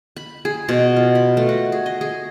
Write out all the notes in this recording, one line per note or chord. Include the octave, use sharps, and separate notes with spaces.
B5
G#4
B2
F4
B5
A3
F#4
G#4
D#5
G#4